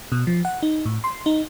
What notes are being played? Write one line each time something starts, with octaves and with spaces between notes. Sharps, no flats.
B2
F3
F#5
D#4
A2
C6
D#4